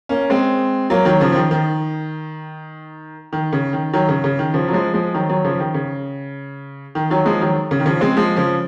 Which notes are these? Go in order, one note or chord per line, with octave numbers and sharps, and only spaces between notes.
A#3 C#4
G#3 C4
F#3 A#3
D#3 F#3
C#3 F3
F3
D#3
D#3
D#3
C#3
D#3
D#3 F#3
C#3
C#3
D#3
C#3 F3
F#3
F3 G#3
F3 G#3
D#3 F#3
D#3 F#3
C#3 F3
D#3
C#3
D#3
D#3 F#3
F3 G#3
D#3 F#3
C#3
D#3
C#3 F3
G#3 C4
F3 G#3
C#3 F3